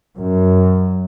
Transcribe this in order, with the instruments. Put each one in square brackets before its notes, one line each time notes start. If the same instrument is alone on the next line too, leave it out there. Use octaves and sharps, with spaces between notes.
[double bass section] F#2